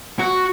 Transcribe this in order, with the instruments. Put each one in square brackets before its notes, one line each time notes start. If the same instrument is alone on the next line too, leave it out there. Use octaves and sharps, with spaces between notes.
[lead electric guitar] F#4